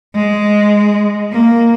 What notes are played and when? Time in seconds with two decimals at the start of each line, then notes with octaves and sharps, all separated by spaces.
0.15 G#3
1.32 A#3